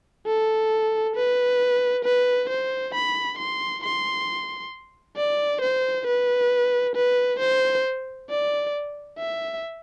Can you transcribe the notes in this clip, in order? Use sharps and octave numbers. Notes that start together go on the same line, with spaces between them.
A4
B4
B4
C5
B5
C6
C6
D5
C5
B4
B4
C5
D5
E5